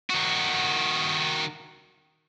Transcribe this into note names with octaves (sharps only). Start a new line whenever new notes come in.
D#3 F#4